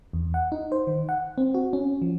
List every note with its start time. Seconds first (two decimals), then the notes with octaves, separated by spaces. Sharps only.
0.13 E2
0.34 F#5
0.52 D#4
0.72 C5
0.87 D#3
1.09 F#5
1.38 C4
1.54 F#4
1.73 C#4
2.02 F3